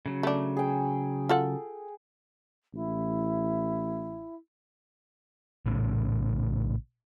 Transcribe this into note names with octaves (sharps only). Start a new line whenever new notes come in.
C#3 F#3
A3 D4
G#4 G5
F4 A4 F#5
A1 E4
A#1 A2 C#3